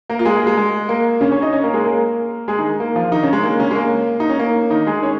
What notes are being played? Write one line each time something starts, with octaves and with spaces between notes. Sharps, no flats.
A#3 A#4
F4
G#3 G#4
A#3
G#3
G#3
A#3
C#3 C#4
C#4 C#5
D#4 D#5
C#4 C#5
A#3 A#4
G#3 G#4
A#3 A#4
G#3 G#4
D#3 D#4
A#3
F3 F4
D#3 D#4
C#3 C#4
G#3
A#3
C#3 C#4
G#3
A#3
D#4
C#4
A#3
D#3 D#4
G#3 G#4
C#4 C#5